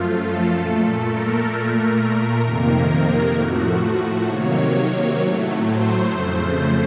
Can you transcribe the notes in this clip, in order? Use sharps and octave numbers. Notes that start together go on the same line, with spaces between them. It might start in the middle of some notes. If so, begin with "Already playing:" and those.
Already playing: F#2 F3 A3 F4
A4
A#2 A3
A#4
A#2 A3
A#4
F2 C3 D#3 A#3
A2 F3 A3 F#4
C3 D#3 F#3 A#3 C#5
A2 F#3 A3
C5
F2 C#3 A3